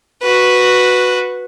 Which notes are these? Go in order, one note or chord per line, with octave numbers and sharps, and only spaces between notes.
F#4 B4